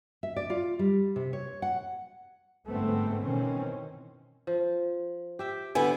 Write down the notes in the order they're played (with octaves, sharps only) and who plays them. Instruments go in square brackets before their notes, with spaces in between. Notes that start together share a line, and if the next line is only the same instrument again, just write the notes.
[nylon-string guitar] E5
D5
F4
G3
C3
C#5
F#5
[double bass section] G1 G#2 D3 A3 B3 C4
B2 D#3 E3 C4 C#4
[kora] F3
G4 E5 G5
[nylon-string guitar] D3 B3 G#5 [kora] G3 E4